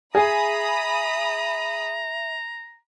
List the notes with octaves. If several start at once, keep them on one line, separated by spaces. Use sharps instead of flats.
G#4 E5 A#5 B5 D#6